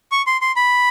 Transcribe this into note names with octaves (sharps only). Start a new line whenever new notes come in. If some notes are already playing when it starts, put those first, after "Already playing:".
C#6
C6
C6
B5